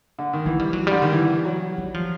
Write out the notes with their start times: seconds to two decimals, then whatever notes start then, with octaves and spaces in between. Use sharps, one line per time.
0.19 D3
0.33 D#3
0.46 E3 G#3
0.60 G3
0.73 F#3
0.87 D3 G3
1.02 D#3
1.12 E3
1.45 F#3
1.78 G3
1.94 F3